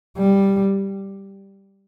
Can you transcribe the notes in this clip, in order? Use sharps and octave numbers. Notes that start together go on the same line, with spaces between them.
G3